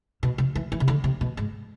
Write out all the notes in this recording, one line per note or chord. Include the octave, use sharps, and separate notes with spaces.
B2
C3
E3
E3
C3
D3
C3
B2
G#2